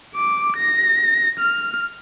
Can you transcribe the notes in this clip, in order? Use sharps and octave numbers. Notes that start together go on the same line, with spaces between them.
D6
A#6
F6